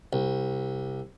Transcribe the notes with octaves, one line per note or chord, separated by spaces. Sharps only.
C2